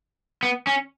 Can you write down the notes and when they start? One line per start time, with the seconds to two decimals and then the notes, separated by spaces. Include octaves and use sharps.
0.43 B3
0.67 C#4